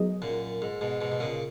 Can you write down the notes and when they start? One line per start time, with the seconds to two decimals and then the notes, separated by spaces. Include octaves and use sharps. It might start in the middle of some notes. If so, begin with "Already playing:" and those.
Already playing: F#3 B3 D#4 G#4 D#5
0.22 F#2 A#2
0.62 G#2
0.81 G#2 B2
1.01 G#2 B2
1.12 B2
1.20 A#2 C#3